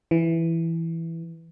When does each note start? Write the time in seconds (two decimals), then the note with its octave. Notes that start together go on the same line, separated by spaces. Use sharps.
0.11 E3